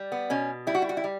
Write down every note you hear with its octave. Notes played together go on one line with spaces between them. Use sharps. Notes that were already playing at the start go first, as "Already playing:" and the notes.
Already playing: G3
B3
B2 C#4
G3 E4
F#4
E4
F#4
E4
G3